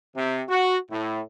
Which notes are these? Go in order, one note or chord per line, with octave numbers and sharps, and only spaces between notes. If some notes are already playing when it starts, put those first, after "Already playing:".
C3
F#4
A2